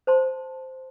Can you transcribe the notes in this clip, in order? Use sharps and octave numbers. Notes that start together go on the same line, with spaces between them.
C5 A5 C6